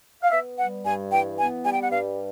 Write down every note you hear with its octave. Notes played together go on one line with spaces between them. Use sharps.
F5
B3 E5
G3 F#5
G2 G#5
E3 G5
B3 G#5
G3 G#5
G5
F#5
G2 F5